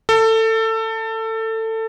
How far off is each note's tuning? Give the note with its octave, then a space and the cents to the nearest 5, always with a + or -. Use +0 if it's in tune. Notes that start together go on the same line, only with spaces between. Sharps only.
A4 +20